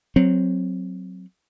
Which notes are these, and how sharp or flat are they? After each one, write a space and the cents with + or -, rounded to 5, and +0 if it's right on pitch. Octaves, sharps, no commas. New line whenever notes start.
F#3 +0 C4 +0